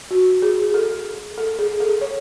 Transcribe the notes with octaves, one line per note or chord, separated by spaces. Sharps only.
F#4
G#4
A4
A4
G#4
A4
C#5